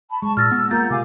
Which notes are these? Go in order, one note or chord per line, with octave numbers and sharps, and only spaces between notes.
A5 B5
G#3 A5 C#6
A#2 E6 F6 A6 A#6
B3
A#3 F4 A#4 F#5 A#5 G6 A6
C3 F5 G#5 D6